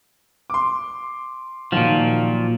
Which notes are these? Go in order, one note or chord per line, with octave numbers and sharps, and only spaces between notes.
C6 D6
A#2 D#3 F3 F#3 F#4